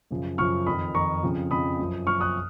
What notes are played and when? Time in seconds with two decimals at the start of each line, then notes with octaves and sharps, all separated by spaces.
0.11 F#2 C#3 F3
0.38 F#2 C#3 F3 C#6 F6
0.67 F2 D#3 B5 D#6
0.94 F2 D#3 A#5 C#6
1.23 F2 C#3 F3
1.51 F2 C#3 F3 B5 D#6
1.79 F#2 F3
2.07 F#2 F3 C#6 F6
2.21 D#6 F#6